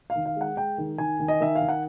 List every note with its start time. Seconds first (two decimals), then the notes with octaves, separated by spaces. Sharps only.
0.10 F5
0.15 D#3
0.26 F5
0.36 G#3 F#5
0.57 G#3 G5
0.78 D#3
0.98 D#3 G#5
1.19 D#3
1.28 D#5
1.40 D#3 E5
1.55 F5
1.61 D#3
1.69 F#5